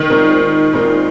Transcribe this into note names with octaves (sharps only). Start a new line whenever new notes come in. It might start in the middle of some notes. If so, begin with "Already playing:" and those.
Already playing: D#3
A#2 G#3 C4 D#4 A#4
A#2 G#3 C4 D#4 A#4